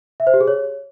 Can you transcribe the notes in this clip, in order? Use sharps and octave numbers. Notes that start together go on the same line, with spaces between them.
E5
C5
G4
G#4
C#5